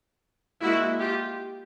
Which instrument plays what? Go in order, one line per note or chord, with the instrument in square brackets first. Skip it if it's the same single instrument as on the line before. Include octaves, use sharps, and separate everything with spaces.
[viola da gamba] G#3 A#3 [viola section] E4 F#4
[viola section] F4 G4